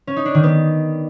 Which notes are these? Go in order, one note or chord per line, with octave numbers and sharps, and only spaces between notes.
C#4
D#4
D4
D#3
B3